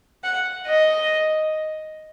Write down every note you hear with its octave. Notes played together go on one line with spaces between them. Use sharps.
F#5
D#5